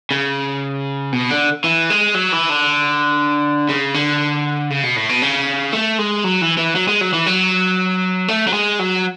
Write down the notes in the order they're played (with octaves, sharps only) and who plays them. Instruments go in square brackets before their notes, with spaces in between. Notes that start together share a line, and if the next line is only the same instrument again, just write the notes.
[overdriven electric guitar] C#3
B2
D3
E3
G#3
F#3
E3
D3
C#3
D3
C#3
B2
A2
B2
C#3
A3
G#3
F#3
E3
E3
F#3
G#3
F#3
E3
F#3
A3
F#3
G#3
F#3